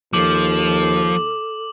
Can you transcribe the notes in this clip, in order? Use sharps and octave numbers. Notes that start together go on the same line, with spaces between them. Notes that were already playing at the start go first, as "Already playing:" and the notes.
D#2 F3 A4 D6 F#7